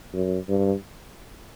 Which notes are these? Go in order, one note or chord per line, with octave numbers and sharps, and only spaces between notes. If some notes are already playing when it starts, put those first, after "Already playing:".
F#2
G2